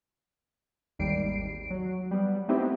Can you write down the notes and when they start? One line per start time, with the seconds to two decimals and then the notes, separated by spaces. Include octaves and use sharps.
0.99 G#1 D#2 G3 C7 D7
1.70 F#3
2.11 G3 B3
2.48 A3 B3 C4 D#4 E4 G4